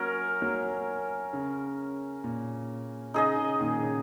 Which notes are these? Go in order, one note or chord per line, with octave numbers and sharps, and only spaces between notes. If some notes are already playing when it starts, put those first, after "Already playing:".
Already playing: F#3 A#3 C#4 A#4 C#5
F#3 A#3
C#3
A#2
C#3 D#4 G#4 D#5
C#3
A#2 D#3
C#3